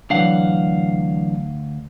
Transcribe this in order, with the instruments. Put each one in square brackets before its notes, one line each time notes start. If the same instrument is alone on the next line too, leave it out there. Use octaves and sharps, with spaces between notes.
[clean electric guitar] D2 F5 F#5 [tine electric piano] E3 F#3 D4